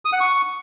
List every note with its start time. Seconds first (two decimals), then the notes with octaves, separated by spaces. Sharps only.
0.05 D#6
0.13 F#5
0.20 C#6